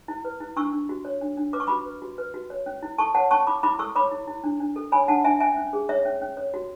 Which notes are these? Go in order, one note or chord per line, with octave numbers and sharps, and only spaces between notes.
E4
B4
E4
D4 C#6 E6
D4
F#4
C#5
D4
D4
B4 D6
C#6
F#4 B5 D6
B4
F#4
B4
F#4
C#5
C#4
E4
A4 A5 C#6
C#5 F#5 A5
C#4 A5 C#6
E4 B5 D6
E4 B5 D6
A4 C#6 E6
C#5 B5 D6
E4
E4
D4
D4
A4
C#5 G#5 B5
D4 F#5 A5
D4 E5 G#5
C#4 E5 G#5
C#4
G#4
C#5 E5
C#4
C#4
C#5
F#4